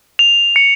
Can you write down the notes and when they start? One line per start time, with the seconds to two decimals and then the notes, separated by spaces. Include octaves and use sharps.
0.19 F7
0.56 C#7